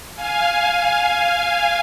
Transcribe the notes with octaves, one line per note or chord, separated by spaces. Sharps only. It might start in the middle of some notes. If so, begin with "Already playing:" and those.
F5 G#5